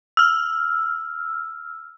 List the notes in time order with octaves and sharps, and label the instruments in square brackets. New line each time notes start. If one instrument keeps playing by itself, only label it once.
[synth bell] E6 F6